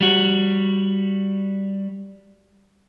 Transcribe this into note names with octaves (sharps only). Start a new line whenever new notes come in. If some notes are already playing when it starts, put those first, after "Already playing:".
G3 F#4